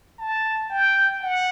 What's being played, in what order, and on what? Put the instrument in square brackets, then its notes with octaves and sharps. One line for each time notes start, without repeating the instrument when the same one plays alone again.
[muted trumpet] A5
G5
F#5